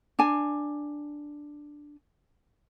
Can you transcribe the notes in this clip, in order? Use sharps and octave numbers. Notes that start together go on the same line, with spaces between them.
D4 G#5